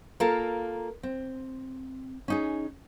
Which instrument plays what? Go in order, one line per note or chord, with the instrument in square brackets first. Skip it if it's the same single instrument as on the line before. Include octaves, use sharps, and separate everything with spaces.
[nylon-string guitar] A#3 F4 A4 A#4
C4
C#4 D#4 G#4